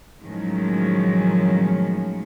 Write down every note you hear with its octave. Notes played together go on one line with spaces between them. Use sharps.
A2 D#3 F3 F#3 G#3 C#4